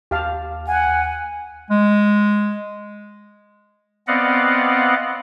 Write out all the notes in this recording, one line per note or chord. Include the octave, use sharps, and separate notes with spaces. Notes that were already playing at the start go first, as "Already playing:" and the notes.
D#2 G4 F5 A5
F#5 G#5
G#3
B3 C4 D5 D#5 F5 F#5